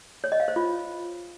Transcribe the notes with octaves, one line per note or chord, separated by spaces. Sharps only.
C#5
D#5
F5
C5
F4